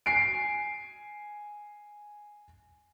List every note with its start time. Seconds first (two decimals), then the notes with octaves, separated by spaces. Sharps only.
0.06 G#5 C7 D7